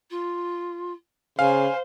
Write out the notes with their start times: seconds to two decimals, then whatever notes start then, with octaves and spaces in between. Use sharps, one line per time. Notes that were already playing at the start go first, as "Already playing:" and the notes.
0.10 F4
1.39 C#3 C5 F5 G#5